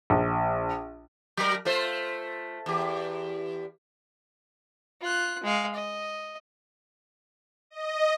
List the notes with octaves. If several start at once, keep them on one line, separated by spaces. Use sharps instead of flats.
A#1
F#3 A#4
A3 F4 C5
E2 G4
F4 F#6
G#3 F5
D#5
D#5